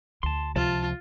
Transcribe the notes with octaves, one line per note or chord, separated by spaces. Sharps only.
D2 A5 C6
C#2 C3 F3 F4 A5